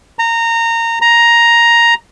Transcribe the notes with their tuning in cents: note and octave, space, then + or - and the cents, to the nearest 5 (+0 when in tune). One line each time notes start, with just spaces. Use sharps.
A#5 -20
A#5 +5